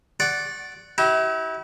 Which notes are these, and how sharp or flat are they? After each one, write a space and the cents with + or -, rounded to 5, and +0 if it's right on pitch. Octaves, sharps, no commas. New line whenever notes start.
D5 -5 F#5 +5 C#6 -30
E4 -30 G4 -45